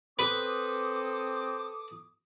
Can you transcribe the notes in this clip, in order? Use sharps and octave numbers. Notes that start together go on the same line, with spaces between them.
C4 A4 B4 D6 D#6